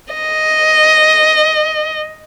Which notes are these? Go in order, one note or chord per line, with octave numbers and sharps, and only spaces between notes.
D#5